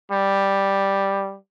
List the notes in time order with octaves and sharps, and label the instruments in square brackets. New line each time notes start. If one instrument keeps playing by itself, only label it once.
[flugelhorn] G3